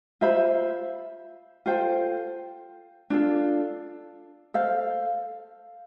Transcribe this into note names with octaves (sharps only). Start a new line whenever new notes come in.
F4 C5 E5 B5
F4 A4 C5 G5
D4 F4 A4
A4 C5 F5